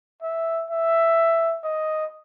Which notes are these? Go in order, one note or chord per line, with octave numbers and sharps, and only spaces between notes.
E5
E5
D#5